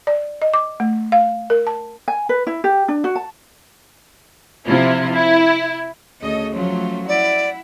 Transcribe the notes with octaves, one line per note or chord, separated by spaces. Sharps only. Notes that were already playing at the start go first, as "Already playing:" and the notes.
D5
D#5
D6
A3
F5
A#4
A5
G#5
B4
E4
G4
D4
F#4
A5
C3 F3 E4 F4
E4
D2 C#3 C#4 A4 D#5
F3 F#3 A3 C#4 F4
E4 D5 F#5